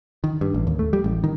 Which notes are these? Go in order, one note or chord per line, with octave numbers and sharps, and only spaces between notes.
D#3
G2
A1
D#2
A3
G3
A1
D#3